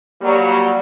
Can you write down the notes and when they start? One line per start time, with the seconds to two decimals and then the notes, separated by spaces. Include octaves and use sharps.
0.21 F#3 G3 A#3